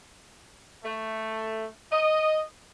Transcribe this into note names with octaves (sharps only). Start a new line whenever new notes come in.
A3
D#5